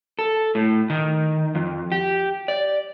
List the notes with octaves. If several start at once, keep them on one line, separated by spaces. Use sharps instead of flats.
A4
A2
D#3
F2
G4
D5